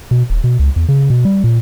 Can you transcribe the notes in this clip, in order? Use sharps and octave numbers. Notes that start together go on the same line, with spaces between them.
B2
D#1
B2
C#2
E2
C#3
B2
G3
A#2